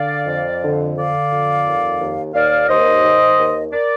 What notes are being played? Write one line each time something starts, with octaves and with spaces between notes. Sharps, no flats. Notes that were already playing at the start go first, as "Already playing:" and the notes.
Already playing: D3 D5 F5
F2
D3
D3 D5 F5
F2
D#2
D#2
D#2 D5 F5
D#2 C5 D#5
D#3
D#2
A#4 D5